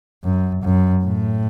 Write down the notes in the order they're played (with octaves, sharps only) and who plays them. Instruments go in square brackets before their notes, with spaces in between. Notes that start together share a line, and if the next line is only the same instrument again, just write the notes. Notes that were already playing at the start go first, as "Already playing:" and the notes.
[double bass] F#2
F#2
A2